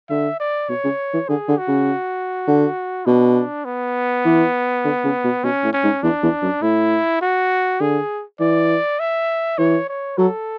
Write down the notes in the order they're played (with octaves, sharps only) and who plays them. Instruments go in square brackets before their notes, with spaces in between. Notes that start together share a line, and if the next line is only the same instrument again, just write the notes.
[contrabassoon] D3 [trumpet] E5
[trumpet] D5
[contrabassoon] B2 [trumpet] C#5
[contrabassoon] C#3
E3
[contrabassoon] D3 [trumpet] G#4
[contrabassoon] D3
[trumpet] F#4
[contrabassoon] C#3
D3
[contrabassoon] B2 [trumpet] D4
[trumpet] B3
[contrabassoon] E3
D3
C#3
B2
[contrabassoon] B2 [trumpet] C#4
[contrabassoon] A2
[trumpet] C#4
[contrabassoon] G#2
[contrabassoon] E2 [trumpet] D4
[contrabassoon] E2
F#2
[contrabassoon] A2 [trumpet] E4
[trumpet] F#4
[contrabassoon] D3 [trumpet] G#4
[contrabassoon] E3 [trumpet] D5
[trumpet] E5
[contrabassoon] E3 [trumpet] C#5
[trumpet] C#5
[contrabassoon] F#3 [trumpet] A4